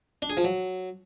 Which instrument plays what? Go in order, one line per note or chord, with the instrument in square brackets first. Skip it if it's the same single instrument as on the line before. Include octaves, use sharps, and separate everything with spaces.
[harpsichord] D4
G#4
F3
F#3